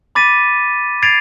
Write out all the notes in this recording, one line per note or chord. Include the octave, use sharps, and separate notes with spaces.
B5 D6 A6 B6 D#7
G#6 A6 C7 D7 F7